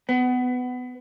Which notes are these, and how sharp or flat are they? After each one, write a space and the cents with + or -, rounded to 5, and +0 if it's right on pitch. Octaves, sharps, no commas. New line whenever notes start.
B3 +20